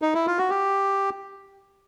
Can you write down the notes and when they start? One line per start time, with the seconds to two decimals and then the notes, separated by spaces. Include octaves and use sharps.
0.02 D#4
0.14 E4
0.27 F4
0.38 F#4
0.50 G4